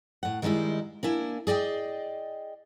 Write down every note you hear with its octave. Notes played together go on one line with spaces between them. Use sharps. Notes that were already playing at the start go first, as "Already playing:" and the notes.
A2 F#5
D#3 G3 G#3 D#4 E4
A#3 D4 E4 G#5
G#4 D5 D#5 G5